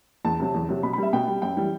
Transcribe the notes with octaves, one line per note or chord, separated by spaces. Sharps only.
E2 A5
C3 F#3
E2
C3 F#3
B2 B5
B5
G3 E5
B2 G5
G3
F#2 G5
E3 G3